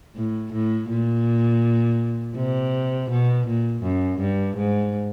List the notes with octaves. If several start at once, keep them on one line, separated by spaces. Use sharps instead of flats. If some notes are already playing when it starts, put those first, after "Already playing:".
A2
A2
A#2
C3
B2
A#2
F#2
G2
G#2